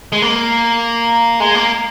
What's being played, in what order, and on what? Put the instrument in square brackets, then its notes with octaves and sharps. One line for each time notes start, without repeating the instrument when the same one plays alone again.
[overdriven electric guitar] G#3
A#3
G#3
A#3